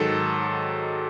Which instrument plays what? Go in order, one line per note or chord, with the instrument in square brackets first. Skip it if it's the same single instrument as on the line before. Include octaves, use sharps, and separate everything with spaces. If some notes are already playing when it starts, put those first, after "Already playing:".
Already playing: [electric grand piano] G#2 D#3 F#3 A4